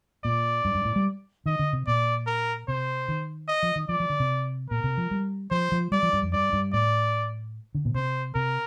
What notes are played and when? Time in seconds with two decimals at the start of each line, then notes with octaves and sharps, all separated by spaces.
0.24 A#2 D5
0.65 G2
0.75 G2
0.85 A2
0.96 G3
1.46 D#3 D#5
1.59 D3
1.73 C3
1.87 A#2 D5
2.27 A#4
2.68 C3 C5
3.08 D#3
3.48 D#5
3.63 F3
3.76 D#3
3.89 F3 D5
4.00 F3
4.10 D3
4.20 C3
4.70 A#2 A#4
4.84 C3
4.98 F3
5.11 G3
5.51 F3 C5
5.72 F3
5.92 G3 D5
6.03 F3
6.13 G2
6.22 F2
6.33 G2 D5
6.53 G2
6.73 A2 D5
7.75 D3
7.85 A#2
7.95 C3 C5
8.35 C3 A#4